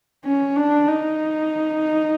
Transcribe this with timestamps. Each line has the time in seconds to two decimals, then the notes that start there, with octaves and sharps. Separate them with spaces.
0.25 C#4
0.56 D4
0.87 D#4